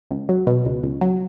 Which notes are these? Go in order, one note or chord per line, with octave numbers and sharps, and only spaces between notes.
C#2
F#3
B2
C#2
C#2
F#3